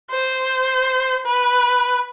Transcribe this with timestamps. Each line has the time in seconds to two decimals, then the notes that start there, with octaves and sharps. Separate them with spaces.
0.11 C5
1.26 B4